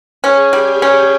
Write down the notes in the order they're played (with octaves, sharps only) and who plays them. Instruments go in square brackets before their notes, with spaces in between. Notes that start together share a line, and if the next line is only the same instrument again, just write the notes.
[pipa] C#4 [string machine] G#4 G#5
[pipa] G3 [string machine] G4 G5
[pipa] C#4 [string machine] G#4 G#5